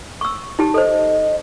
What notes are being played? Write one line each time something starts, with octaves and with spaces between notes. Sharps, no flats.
C#6 E6
D#4 G4 A5
A4 C5 D#5